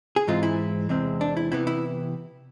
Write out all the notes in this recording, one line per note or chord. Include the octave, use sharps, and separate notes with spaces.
G#4
G#2 E3 G#3 C4 F4
E4
E2 C3 G#3 C4
D4
E4
C3 E3 B3 E4
E4